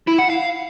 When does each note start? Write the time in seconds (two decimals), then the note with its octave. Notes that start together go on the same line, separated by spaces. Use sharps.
0.08 E4
0.19 F#5
0.30 F5